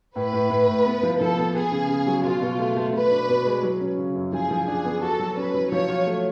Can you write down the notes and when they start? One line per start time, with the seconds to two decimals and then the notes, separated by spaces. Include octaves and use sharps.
0.16 A2 B4
0.33 A2
0.50 A2
0.68 A2
0.86 B3
1.03 F3
1.20 F3 A4
1.37 B3
1.55 B3 G#4
1.72 C#3
1.89 C#3
2.06 F#3
2.24 B2 F4
2.41 B2
2.58 A3
2.76 A3
2.93 B2 B4
3.11 D4
3.29 B2
3.45 G#3
3.62 F#3
3.81 C#4
3.98 C#3
4.15 F#2
4.32 F3 G#4
4.50 F3
4.67 D4 G#4
4.85 B3
5.01 F#4 A4
5.19 F#3
5.36 C#4 B4
5.54 F#3
5.71 F3 C#5
5.89 F4
6.06 A3